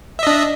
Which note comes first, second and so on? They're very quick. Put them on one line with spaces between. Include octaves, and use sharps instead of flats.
E5 D#5 D4